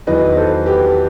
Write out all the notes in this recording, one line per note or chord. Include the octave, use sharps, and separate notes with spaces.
E2 D#3 F#3 B4 D#5
A4 C5
G4 B4